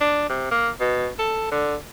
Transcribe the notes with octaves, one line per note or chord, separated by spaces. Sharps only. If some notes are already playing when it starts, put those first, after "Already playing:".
D4
C3
A#3
B2
A4
D3